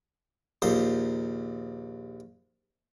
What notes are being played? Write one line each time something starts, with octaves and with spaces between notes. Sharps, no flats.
A#1 D#2 C5